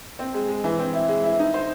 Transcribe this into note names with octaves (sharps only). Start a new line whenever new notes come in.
C4
G#3
G#3
E3
C4
E4
G#3
E4
D#4
C5